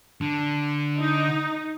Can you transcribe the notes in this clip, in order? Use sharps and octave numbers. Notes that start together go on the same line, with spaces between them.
D3
D#4